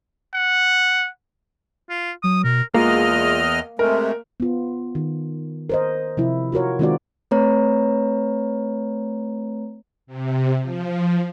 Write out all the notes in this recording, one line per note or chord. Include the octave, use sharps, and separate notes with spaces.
F#5
F4
F#3 D#6
B2 A#4
E2 G#3 A#3 F4 D#5 F6
C3 G#3 A3 A#4
B3 F4
D#3
A#4 C5 D#5
C3 F3 E4
F4 F#4 A#4 C#5
D#3 G#3 C4 F4 F#4 D5
A3 C4 B4 C#5 A#5
C3
F3